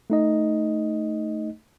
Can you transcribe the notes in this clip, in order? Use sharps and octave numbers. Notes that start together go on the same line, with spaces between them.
A3 D#4 D#5